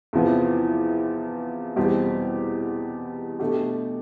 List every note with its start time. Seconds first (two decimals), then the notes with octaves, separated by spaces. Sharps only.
0.13 E2 C3 F3 B3 E4
1.76 E2 B2 G3 C4 G4
3.40 B2 A3 D4 G4